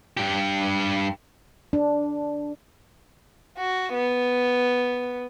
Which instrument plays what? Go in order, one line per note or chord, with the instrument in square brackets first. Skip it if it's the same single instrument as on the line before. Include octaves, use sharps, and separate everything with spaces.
[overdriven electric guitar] G2 G4
[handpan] D4
[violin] F#4
B3